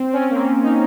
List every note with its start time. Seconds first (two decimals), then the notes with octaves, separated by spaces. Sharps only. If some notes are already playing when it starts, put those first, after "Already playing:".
Already playing: C4
0.13 C#4
0.21 C4
0.30 A#3
0.35 C4
0.63 D#4